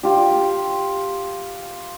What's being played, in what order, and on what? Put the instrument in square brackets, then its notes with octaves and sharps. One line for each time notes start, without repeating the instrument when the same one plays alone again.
[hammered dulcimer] F4 G4